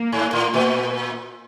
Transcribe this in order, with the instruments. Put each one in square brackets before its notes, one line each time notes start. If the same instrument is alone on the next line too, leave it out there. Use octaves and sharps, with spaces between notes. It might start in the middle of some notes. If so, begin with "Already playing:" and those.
Already playing: [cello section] A#3
[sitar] G#2
A2
[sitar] A#2 [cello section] A#3